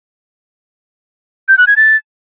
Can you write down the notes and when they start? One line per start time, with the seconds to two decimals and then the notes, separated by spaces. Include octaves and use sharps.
1.49 G6
1.58 F#6
1.67 G#6
1.77 A6